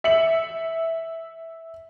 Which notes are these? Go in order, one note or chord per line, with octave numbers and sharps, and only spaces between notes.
E5 C#7 F#7